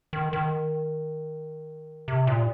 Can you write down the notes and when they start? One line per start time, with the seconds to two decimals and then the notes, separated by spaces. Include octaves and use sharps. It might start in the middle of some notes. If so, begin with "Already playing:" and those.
0.13 D#3
0.33 D#3
2.08 C3
2.27 A#2